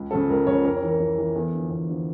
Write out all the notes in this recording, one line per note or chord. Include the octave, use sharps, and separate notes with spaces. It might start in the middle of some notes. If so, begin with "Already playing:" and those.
Already playing: C#2
C#3 F3 A4
C#2 A#4
C#3 F3 C#5
F2 A#4
C#5
E3
A#4
F2
E3
E2 A4
D3 F3
E2
D3 F3